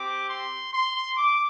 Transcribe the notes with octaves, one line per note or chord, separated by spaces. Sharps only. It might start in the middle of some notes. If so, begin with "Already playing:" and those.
Already playing: C4 G4 D6
C6
C6
D6